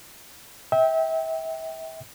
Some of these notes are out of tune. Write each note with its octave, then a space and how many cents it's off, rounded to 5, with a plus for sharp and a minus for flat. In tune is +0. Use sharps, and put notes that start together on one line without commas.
E5 -30 G5 +0